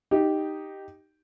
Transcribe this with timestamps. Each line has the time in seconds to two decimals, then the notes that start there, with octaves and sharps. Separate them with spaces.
0.11 D#4 G4